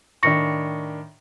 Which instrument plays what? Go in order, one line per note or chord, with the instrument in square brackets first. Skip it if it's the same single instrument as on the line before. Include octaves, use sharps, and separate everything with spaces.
[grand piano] A2 D#3 D4 [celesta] C#6 A#6 C#7